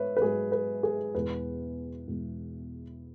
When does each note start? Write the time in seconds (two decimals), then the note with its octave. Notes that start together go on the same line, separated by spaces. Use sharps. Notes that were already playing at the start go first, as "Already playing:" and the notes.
Already playing: G#2 B4 C#5 E5
0.17 B4
0.22 G#2 F#3 G#4
0.52 B4
0.83 G#4
1.15 E2 B2 G#3 B4
2.07 E2 B2 G#3